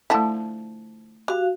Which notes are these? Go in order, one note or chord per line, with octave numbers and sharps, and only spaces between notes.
D3 F3 A3 E4 A5
F#4 G4 F5